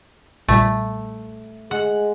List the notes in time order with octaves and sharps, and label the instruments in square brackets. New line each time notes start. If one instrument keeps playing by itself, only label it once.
[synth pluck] B1 A#2 G3 [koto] A3
[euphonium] G#3 [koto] F#5